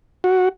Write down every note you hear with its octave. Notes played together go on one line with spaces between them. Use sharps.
F#4